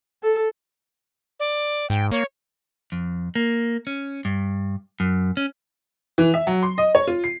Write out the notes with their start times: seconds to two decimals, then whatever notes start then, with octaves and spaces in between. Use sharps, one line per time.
0.23 A4
1.40 D5
1.90 G#2 G5
2.12 A#3 C#5
2.92 F2
3.35 A#3
3.87 C#4
4.25 G2
5.00 F#2
5.37 C#4
6.18 E3
6.34 E5
6.47 F#3
6.63 C6
6.78 D#5
6.95 C#5
7.08 F4
7.24 C7